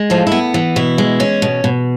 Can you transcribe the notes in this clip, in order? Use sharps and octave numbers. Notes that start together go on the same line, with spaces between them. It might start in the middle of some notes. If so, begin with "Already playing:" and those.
Already playing: G#3
A2 F3 F4
E4
B3
E3
B2 E4
G#3
C#4
B2
B2